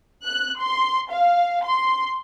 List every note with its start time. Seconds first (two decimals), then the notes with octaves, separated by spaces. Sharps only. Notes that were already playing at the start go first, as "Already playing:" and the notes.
0.24 F#6
0.60 C6
1.12 F5
1.64 C6